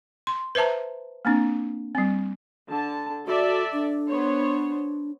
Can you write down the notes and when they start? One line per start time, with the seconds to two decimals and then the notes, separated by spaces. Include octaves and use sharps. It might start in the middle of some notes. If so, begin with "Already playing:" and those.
0.27 C6
0.55 B4 C5 E5 A5 A#5
1.25 A#3 C4 D4
1.95 G3 C4
2.68 D3 A5
3.27 F#4 A4 D5 E5
3.73 D4
4.08 B3 C5 C#5